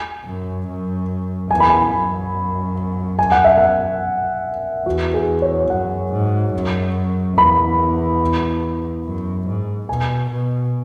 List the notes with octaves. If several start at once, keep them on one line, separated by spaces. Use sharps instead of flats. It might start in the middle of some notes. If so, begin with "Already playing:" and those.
Already playing: G#5
F#2
F#2
E2 G#5
B5
G#5
F#2
G#5
F#5
E5
F#5
E2 F#4
G#4
C#5
F#2 F#5
G#2
F#2
E2 B5
F#2
G#2
B2 G#5
B2